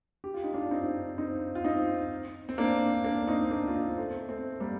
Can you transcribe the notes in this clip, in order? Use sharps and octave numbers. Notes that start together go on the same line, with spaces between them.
G4
F4
D#4
D4 F4
C4 D#4
C4 D#4
F4
C4 D#4
C4
A#3 D4
A#3 D4
C4 D#4
A#3 D4
F4
C4 D#4
A3 C4
A3 C4
G3 A#3